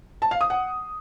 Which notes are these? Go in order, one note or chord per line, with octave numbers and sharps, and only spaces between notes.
A5
F5
D#6
F#5